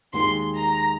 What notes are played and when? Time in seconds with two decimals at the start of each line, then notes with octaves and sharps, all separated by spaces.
0.13 D#2 D#3 G#3 C6
0.57 A#5